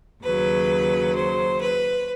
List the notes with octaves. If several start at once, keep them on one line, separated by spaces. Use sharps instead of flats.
D#2 C#3 F#3 B4
C5
B4